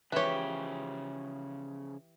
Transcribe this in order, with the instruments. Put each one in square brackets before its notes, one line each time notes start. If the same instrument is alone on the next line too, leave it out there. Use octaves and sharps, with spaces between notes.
[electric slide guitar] C#3 F3 [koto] E3 G4 [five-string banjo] B4 C#5